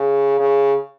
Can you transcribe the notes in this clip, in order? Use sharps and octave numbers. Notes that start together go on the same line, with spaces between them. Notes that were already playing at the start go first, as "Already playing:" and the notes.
Already playing: C#3
C#3